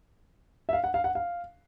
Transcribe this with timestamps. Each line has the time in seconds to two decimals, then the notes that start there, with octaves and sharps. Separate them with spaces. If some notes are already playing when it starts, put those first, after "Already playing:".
0.69 E5
0.73 F5
0.84 F#5
0.94 F5
1.04 F#5
1.15 F5